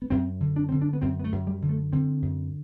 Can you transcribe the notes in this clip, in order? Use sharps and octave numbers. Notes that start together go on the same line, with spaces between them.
B3
F#2 C4
D3
D4
D3 C4
D4
B3
F#2 C4
B3
A3
F#2
G3
D3
A3
D3 C4
F#2